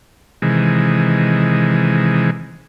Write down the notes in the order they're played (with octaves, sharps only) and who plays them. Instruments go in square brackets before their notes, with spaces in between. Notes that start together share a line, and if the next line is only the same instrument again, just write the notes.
[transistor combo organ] C3 D#3 E3 G#3